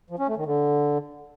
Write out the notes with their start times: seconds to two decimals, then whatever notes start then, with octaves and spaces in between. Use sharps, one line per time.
0.10 F3
0.19 C#4
0.28 A3
0.37 D#3
0.46 D3